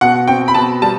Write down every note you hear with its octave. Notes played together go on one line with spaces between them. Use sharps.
B2 F#5
C4 G5
B5
B2 A5
G3 A5